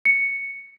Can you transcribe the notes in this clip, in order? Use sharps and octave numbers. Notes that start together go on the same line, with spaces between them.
C#7